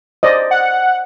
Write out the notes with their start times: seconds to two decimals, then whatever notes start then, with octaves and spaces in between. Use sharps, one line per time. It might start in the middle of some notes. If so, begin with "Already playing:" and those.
0.23 C5 D5 D#5
0.51 F#5